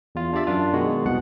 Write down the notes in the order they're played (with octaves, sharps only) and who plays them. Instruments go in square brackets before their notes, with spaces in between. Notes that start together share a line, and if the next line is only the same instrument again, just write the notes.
[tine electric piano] E2 F4
D4 F4 G4 D5 E5
F#2 D4 F4
B2 D#3 G#3 F#4
C2 F2 B2 F#5